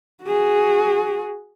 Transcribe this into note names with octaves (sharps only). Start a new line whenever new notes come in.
F#4 G#4